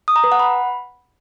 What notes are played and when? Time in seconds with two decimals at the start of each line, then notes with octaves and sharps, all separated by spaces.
0.08 D#6
0.16 A#5
0.24 B4
0.32 F#5
0.40 B5